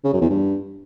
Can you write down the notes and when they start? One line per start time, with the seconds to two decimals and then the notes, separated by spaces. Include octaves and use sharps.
0.04 C#3
0.13 F#2
0.21 E2
0.30 G2